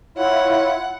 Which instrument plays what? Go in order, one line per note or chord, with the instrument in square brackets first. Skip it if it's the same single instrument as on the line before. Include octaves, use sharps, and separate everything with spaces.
[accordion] E4 F4 [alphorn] C#5 [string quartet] F#5